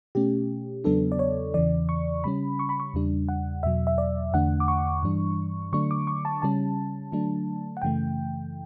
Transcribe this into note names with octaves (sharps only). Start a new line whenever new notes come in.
B2 A3 C#4 G4
E2 C#3 F#3 B3 D4 A4
D5
C#5
E2 C#3 E3 D5
C#6
C#3 G3 C#4 B5
C#6
B5
C#6
E2 C#3 G3 D4
F#5
E2 B2 F#3 E5
E5
D5
E2 D3 A3 D4 F#5
D6
C#6
G2 E3 G3 D4
D3 F#3 A3 D4 C#6
D6
C#6
A5
C#3 G3 C#4 A5
D3 F#3 A3 D4
F#5
F#2 C#3 E3 A3 G5